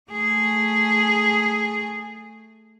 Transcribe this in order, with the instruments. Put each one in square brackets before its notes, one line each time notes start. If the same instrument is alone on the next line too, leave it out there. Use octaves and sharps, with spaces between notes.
[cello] A3 G#4